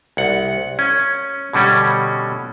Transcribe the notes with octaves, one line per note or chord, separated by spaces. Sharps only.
C2 F#5
C#4
B2 D3 G3 C#4